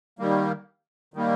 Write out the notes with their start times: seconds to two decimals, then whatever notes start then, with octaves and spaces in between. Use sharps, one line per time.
0.19 D#3 G3 A#3
1.14 D#3 G3 A#3